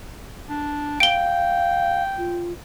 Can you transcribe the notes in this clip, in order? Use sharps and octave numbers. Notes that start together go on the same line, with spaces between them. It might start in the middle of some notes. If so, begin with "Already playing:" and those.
D4
F5 G5 D7 G7
F4